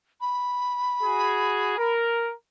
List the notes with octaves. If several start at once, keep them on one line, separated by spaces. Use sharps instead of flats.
B5
F#4 G#4
A#4